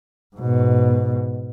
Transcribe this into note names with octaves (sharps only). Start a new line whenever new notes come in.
G#2 B2